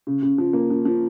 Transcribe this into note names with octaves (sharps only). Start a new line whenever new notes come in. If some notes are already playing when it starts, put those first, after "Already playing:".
C#3
C#3
F3
A#3
F3
F3